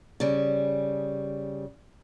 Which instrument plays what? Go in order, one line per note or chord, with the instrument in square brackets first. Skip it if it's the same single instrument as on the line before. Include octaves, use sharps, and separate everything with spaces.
[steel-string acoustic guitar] C#3 G3